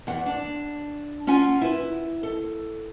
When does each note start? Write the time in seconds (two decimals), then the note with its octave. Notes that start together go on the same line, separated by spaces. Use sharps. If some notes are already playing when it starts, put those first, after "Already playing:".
0.07 E2 F#5
0.26 D4
1.27 C#4 F4 F#5 G#5
1.61 E4 B4
2.23 A4